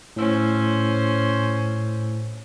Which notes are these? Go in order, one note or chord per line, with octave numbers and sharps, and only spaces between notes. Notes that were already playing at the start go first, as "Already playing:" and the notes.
A2 C#4 C5 E6